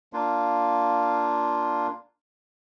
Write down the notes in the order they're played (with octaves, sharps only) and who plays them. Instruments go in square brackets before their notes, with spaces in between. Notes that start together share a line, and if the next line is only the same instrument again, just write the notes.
[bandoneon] A#3 D4 F4